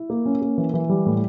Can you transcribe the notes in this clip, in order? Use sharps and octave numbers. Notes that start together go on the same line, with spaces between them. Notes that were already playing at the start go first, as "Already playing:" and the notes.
Already playing: E4
A#3
C#4
A#3
E3
E3
G3
A2